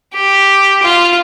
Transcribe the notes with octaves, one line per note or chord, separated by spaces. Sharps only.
G4
F4